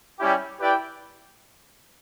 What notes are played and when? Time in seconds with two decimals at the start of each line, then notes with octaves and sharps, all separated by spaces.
0.19 G3 C#4 E4 G4
0.60 E4 G4 B4 D5 G5